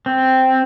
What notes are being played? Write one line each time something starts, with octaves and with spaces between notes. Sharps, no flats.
C4